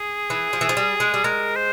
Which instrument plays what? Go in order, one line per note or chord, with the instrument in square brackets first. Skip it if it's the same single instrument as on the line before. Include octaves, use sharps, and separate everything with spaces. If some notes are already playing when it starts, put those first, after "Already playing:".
Already playing: [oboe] G#4
[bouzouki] E3
F3
E3
F3
G3
G#3
G3
[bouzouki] G#3 [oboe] A#4
[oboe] C5